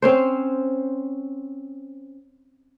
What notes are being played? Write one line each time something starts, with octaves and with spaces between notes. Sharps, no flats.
C4 C#4 C5